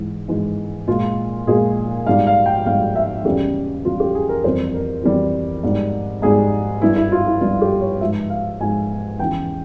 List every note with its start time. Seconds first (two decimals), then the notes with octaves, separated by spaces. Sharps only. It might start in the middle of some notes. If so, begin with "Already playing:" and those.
Already playing: G#2 E3 G#3
0.28 G#2 E3 G#3
0.88 A#2 G#3 F4
1.47 A#2 G#3 G#4
2.06 G#2 G3 F5
2.27 F5
2.46 G5
2.66 G#2 G3 F5
2.95 E5
3.25 E2 C#3 G3 G4
3.84 E2 C#3 G3 F4
4.00 G4
4.15 G#4
4.29 A#4
4.44 F2 E3 G3 C5
4.74 A#4
5.03 F2 E3 G3
5.63 G#2 G3
6.22 G#2 G3 G#4
6.82 G2 G3 E4
6.96 E4
7.12 F4
7.27 E4
7.41 G2 G3 F4
7.62 G4
7.81 C#5
8.00 G#2 F3 G#3 E5
8.30 F5
8.60 G#2 F3 G#3 G#5
9.19 E2 C#3 E3 G5